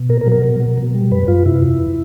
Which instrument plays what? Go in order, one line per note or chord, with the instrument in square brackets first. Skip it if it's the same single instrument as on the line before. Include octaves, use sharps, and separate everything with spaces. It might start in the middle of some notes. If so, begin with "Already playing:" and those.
Already playing: [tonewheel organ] B2
A#2 A#4
A#4
F#3
A#4
B2
F#3
B2
G3
F#2 B4
F#2 F4
C3 E4
E2